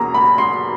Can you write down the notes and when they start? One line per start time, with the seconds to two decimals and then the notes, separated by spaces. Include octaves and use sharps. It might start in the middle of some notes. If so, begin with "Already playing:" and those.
Already playing: E2 B2 A#3 C#4 A#5
0.14 B5
0.38 C6